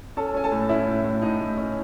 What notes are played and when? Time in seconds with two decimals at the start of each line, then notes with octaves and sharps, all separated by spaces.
0.17 C#4 A4 A5
0.34 C#4 G#5
0.43 A4 A5
0.52 A2
0.69 C#4 E4 E5
0.87 A2
1.04 A2
1.22 A2 D#4 D#5
1.41 A2
1.57 C#4